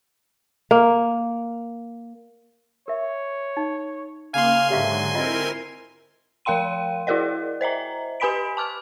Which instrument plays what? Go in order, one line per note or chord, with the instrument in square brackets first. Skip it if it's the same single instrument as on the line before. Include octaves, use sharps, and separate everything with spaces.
[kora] A#3
[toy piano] A#4 E5 [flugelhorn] C#5
[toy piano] D#4
[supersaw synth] C#3 A#3 [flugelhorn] F5 [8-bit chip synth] G#5 C6
[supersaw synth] G#2 D3 [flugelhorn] F#3 [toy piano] G4 E5 F5
[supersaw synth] C4 E4 A#4 [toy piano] F4 D#5
[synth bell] F3 A#4 F5 G5 C6 D#7
E4 F#4 G#4 A#4 D5 D#5
C5 D#5 E5 A#5
G4 B4 G#5 B5 B6 D7
A5 D6 F6